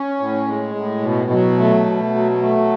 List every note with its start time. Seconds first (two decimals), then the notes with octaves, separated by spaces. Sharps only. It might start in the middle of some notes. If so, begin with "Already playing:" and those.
Already playing: C#4
0.20 A2
0.47 G#3
0.75 A2
1.02 B2
1.31 F#3
1.59 A3
1.86 B2
2.14 F#3
2.42 A3